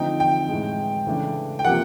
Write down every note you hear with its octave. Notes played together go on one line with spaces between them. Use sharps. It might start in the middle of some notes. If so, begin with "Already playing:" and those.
Already playing: D3 F3 A3 C4 D#4 G5
G5
A2 E3 G#3
C#3 E3 A3 D4
G5
C3 F3 A#3 F#5